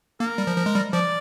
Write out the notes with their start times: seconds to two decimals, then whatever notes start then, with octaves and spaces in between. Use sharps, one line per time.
0.20 A#3 A#4
0.38 G3
0.47 F3
0.57 F3
0.66 G#3
0.75 G3
0.93 F3 D5